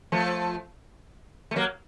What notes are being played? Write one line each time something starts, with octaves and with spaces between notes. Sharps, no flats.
F3 A3
A3
F#3 A#3